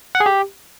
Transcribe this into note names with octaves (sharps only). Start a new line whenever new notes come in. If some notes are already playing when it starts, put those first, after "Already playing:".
F#5
G#4
G4